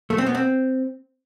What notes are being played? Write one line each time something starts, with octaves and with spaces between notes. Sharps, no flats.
A3
C4
B3
C4